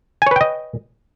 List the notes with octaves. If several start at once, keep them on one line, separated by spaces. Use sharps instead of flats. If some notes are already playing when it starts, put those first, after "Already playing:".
B4 C#5 D#5 G5 G#5